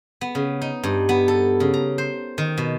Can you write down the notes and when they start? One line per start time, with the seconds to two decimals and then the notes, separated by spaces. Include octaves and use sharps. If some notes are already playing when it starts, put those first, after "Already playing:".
0.21 B3
0.35 C#3
0.62 D#4
0.83 G2
1.09 B3
1.28 A4
1.60 C#3
1.74 A#5
1.98 C5
2.38 D#3
2.58 B2